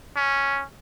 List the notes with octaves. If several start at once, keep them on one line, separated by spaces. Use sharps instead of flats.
C#4